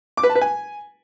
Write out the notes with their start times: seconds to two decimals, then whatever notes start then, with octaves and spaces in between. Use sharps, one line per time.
0.17 D6
0.23 B4
0.29 A5
0.35 B4
0.41 G#5